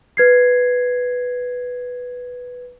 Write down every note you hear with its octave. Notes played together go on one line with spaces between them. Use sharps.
B4 G#6 C7